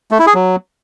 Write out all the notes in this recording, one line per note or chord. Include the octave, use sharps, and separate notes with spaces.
A3
E4
G#4
F#3